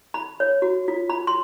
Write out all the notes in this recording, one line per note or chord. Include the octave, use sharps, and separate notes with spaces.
B5
C#5
F#4
F4
B5
C6